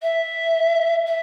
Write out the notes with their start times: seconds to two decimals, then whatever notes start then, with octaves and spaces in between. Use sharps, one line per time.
0.02 E5
1.06 E5